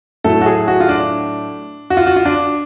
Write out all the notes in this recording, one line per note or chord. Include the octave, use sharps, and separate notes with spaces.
A2 F#3 A3 A4
F#4
G#4
F#4
F4
D4
F#4
F4
F#4
F4
D4